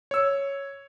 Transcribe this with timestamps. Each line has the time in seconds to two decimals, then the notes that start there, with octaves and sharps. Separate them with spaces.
0.11 C#5 E6